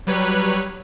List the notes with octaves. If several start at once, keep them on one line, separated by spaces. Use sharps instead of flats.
F#3 G3 B4 C#5 F#6